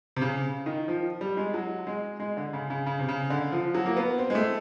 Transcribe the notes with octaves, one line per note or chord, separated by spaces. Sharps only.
C3
C#3
D#3
F3
G3
G#3
F#3
G#3
G#3
D3
C#3
C#3
C#3
C3
C#3
D3
F3
F#3
A#3
B3
C4
G#3
A3